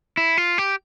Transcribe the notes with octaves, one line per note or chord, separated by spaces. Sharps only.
E4
F4
G4